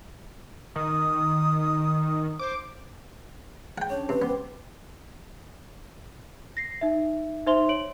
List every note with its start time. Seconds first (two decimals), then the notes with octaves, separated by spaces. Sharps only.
0.76 D#3 D#6
2.39 C5 D6
3.78 G#4 F#5 G5
3.90 C#4 D4 C#5 A5
4.09 C3 C#4 B4 C6
4.22 B3 C5 G5 D6
6.57 A#6 C7
6.81 D#4 E5
7.47 D#4 C5 E5 C6 F7 G7
7.69 C#5 D7 F#7